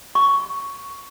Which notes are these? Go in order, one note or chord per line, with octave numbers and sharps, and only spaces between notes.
C#6